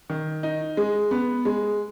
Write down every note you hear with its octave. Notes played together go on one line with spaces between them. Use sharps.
D#3
D#4
G#3
B3
G#3